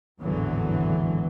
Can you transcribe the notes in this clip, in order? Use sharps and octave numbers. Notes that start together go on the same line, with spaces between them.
G#1 E2 A2 D3 E3 F#3